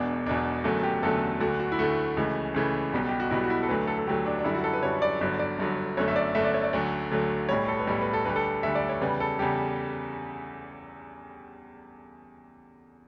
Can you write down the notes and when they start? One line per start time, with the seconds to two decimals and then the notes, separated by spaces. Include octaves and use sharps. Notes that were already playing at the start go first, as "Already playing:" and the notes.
Already playing: E1 E2 B2 D4
0.26 E1 E2 B2 D4
0.64 F#1 E2 D3 F#3 A3
0.83 G4
1.02 F#1 E2 D3 F#3 A3 A4
1.40 D2 D3 A3 F#4
1.60 F#4
1.72 E4
1.79 D2 D3 A3 F#4
2.17 C#2 C#3 E3 A3
2.54 C#2 C#3 E3 A3
2.93 B1 B2 G3
3.09 G4
3.20 F#4
3.30 B1 B2 G3 E4
3.44 F#4
3.50 E4
3.63 A4
3.69 D2 D3 F#3 A3 B4
3.87 A4
3.98 A4
4.07 D2 D3 F#3 A3 G4
4.26 D4
4.39 D4
4.44 F#2 D3 G3 E4
4.55 F#4
4.64 A4
4.73 B4
4.83 F#2 D3 G3 C#5
5.02 D5
5.21 G1 G2 D3 F#3 D5
5.39 D5
5.59 G1 G2 D3 F#3
5.97 G1 F#2 D3 A3 C#5
6.08 E5
6.16 D5
6.35 G1 F#2 D3 A3 E5
6.44 D5
6.54 C#5
6.64 D5
6.73 D2 D3 F#3 A3 C#5
7.11 D2 D3 F#3 A3
7.49 B1 A2 G3 C#5
7.68 A4
7.79 B4
7.87 B1 A2 G3 A4
8.02 B4
8.13 A4
8.25 D2 D3 G3 B4
8.36 A4
8.63 D2 D3 G3 E5
8.75 D5
8.89 C#5
9.01 E2 C#3 G3 B4
9.20 A4
9.39 E2 C#3 G3 G4